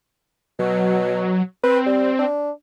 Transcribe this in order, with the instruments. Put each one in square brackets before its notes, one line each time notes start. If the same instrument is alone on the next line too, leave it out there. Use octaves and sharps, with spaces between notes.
[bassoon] B2 [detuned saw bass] F#3
[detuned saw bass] C4 [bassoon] B4
[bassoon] G3
D4